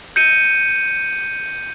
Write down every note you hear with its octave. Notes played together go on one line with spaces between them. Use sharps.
G6 C#7 D#7